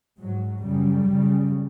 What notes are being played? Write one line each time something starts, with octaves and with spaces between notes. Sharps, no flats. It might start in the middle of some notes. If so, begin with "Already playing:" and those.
G#2 F#3
F#2 C#3 G3
F#2 C#3